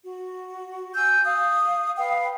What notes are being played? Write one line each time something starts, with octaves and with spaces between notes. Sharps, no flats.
F#4
G#5 E6 G6
F5 D#6
B4 F5 G5